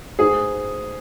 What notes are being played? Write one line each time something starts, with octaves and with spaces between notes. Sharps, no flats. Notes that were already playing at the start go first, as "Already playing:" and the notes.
G#2 G#4